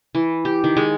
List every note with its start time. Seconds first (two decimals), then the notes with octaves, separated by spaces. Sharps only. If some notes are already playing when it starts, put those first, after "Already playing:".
0.15 E3
0.45 G4
0.64 D#3
0.77 G#3